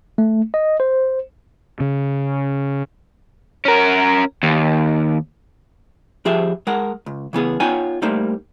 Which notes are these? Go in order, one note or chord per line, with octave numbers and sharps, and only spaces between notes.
A3
D#5
C5
C#3
C#4 A#4
D#2
F3 G4 G#4 C5 E5
G#3 A#4 F#5
C#2
C#3 E3 B3 G#4
B3 D#4 F4 C#5 G5 G#5
G3 A3 A#3 D#4 C5